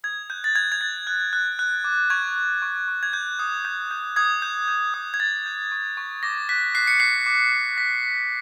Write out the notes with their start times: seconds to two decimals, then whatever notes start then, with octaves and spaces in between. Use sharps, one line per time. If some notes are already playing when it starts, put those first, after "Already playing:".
0.04 D#6 G#6
0.30 F#6 G6
0.44 A6
0.55 F#6 G#6
0.72 G#6
0.81 F#6 A6
1.07 F#6
1.33 F#6
1.59 F#6
1.84 D6
2.10 C#6 G#6
2.36 C#6
2.62 C#6
2.88 C#6
3.03 G#6
3.13 G6
3.39 D#6
3.65 G6
3.91 G6
4.16 D#6 G#6
4.42 G6
4.68 G6
4.94 D#6
5.14 G#6
5.20 G6 A6
5.46 G6
5.72 C#6
5.97 C#6
6.23 D6 A#6
6.49 F#6 B6
6.75 F#6 C7
6.87 C#7
7.00 F#6 C7
7.26 D6
7.52 D6
7.77 D6 B6
8.04 F#6